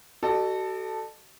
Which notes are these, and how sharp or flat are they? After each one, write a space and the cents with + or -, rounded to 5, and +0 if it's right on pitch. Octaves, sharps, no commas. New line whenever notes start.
F#4 +35 A4 +0 D#5 -45